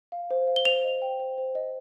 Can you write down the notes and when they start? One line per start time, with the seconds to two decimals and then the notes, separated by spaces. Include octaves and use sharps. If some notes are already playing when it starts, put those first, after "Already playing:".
0.12 F5
0.31 C5
0.47 F5
0.56 G7
0.65 C5 F7
0.84 D#5
1.02 G5
1.20 C5
1.38 C5
1.55 D#5